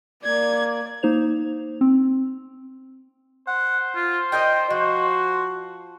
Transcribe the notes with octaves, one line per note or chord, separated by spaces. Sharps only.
A#3 D5 G#6
A#3 D#4 C5 F7
C4
C5 F#5
F4
D#4 A#4 D#5 G5
F3 F#4